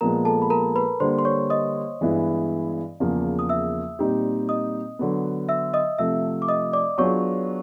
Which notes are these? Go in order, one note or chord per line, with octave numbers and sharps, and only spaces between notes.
A#2 F3 G#3 B3 A#4 A#5
A4 A5
B5
A#4 A#5
B4 B5
D3 G3 A#3 C5 C6
C6
C#5 C#6
D#5 D#6
G2 E3 G#3 B3 E4
E2 C#3 F3 A#3
D#6
E5 E6
A#2 G3 C4 D#4 G4
D#5 D#6
D3 F#3 B3
E5 E6
D#5 D#6
C3 F3 A3 E5 E6
D6
D#5 D#6
D5 D6
F#3 B3 D4 F4 G#4 C#5 C#6